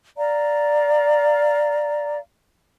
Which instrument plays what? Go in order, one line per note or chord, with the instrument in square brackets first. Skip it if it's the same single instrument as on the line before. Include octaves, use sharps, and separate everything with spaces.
[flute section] D5 F5 A#5